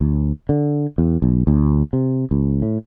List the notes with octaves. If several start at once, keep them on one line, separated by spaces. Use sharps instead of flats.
D2
D3
E2
B1
D2
C3
C#2
A2